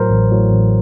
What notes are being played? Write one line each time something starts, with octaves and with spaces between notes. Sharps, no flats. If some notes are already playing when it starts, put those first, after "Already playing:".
Already playing: A2 F#3 A#4 C5
A1
A2 F#3
A1